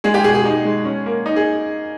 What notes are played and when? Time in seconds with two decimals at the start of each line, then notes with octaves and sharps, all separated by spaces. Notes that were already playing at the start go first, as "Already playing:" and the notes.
0.04 G#3 G#4
0.14 G4
0.24 B2 G#4
0.35 G#4
0.45 D#4
0.65 G#3
0.85 C#4
1.06 A#3
1.26 D#4
1.36 G#4